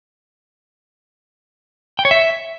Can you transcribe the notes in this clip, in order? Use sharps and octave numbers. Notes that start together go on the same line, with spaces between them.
G5
C#5
E5